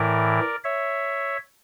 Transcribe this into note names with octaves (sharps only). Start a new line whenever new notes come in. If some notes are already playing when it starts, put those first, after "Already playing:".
Already playing: A2 E3 A#4 D5
C#5 E5